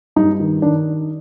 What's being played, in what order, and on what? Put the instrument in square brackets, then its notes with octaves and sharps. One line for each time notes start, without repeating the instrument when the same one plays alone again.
[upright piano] G2 D#4
D#3
D#3 D4